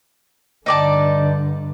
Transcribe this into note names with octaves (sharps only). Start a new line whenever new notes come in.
G2 D3 D#4 D5 A5